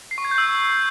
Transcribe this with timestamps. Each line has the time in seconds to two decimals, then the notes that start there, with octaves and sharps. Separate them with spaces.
0.11 C7
0.18 C#6
0.25 G#6
0.31 G6
0.38 E6